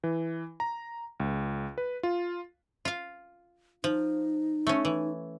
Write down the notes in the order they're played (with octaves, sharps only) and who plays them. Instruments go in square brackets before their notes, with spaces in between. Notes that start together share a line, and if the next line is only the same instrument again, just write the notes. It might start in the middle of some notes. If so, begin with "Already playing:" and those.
[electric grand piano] E3
A#5
C#2
B4
F4
[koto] F4 F5
[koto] F3 [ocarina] D#4
[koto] A3 C#4
E3